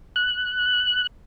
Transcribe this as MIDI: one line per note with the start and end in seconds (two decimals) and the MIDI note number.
0.16 1.07 90